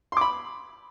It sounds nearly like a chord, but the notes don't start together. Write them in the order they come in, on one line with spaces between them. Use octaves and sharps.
C6 D6 B5